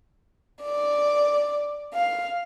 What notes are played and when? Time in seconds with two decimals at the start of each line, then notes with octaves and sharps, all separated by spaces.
0.63 D5
1.94 F5